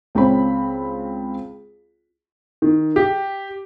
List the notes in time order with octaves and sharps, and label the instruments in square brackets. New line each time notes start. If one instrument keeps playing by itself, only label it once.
[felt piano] C#2 C4 C#5 B5
[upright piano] D#3
G4